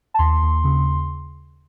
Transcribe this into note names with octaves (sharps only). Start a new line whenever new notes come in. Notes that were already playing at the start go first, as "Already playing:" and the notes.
A5
D#2 C6
D#2
C#3